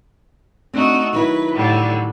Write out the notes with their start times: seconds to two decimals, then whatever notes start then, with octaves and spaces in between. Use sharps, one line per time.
0.73 A3 C4 D4 D#4 F#4
1.13 D#3 F#3 E4 B4
1.53 A2 D3 G3